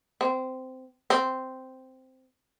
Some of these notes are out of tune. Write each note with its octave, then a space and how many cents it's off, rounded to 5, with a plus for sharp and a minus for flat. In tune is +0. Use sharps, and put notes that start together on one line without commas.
C4 -15
C4 -5